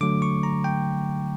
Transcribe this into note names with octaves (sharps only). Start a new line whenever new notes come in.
D3 F#3 A3 D6
C#6
A#5
G5